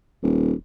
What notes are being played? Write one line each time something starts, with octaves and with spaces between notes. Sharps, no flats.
D#1